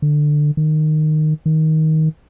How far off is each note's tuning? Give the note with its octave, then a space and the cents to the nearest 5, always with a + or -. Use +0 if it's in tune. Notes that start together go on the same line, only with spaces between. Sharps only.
D3 +15
D#3 -15
D#3 +15